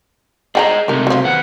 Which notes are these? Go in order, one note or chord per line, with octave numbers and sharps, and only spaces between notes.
G#4 C5 D5 D#5 G5 A#5
C#2 C3 A3 D#4 A#4
F3 F#3
D#2 B3 F#5